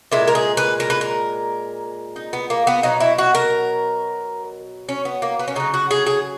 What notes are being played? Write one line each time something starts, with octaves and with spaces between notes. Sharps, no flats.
A#2 G#3 E4
A#4
G#4
B4
A#4
B4
A#4
D#4
B3
A#3
B3
B2 F#3 D#4
E4
F#4
A#4
C#4
B3
A#3
B3
C#4
C#3 F#3 D#4
F#4
G#4
G#4